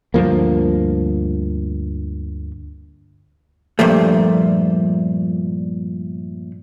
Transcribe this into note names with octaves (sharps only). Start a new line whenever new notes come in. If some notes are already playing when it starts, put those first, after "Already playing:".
D2 G2 F3 A#3
G2 A#2 F3 A3